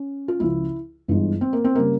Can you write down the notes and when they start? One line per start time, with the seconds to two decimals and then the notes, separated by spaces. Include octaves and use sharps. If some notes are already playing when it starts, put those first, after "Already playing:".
Already playing: C#4
0.28 F4
0.40 C#2 C#3 F3 E4
1.08 G1 G2 E3 G#3
1.41 C4
1.53 A#3
1.64 C4
1.75 C#3 G3 A#3